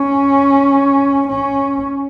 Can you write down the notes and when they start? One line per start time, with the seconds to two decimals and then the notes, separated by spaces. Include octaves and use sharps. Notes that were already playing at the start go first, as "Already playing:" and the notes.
Already playing: C#4
1.28 C#4